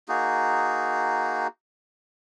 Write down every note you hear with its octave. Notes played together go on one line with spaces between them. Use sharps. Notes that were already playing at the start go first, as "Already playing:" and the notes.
A#3 D#4 F#4 G#4